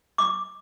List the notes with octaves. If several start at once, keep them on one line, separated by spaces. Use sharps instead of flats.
D6